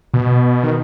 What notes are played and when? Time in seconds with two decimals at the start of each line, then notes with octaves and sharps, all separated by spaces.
0.14 B2
0.63 D#3